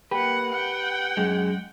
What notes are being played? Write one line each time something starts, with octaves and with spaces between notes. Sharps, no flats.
A#3 G4 B4 F#5
F#5 G5
F#2 G#3